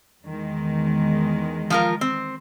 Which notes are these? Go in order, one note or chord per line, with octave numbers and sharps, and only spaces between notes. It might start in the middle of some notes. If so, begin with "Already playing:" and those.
E2 D#3 G#3
F3 F4 A#4
C4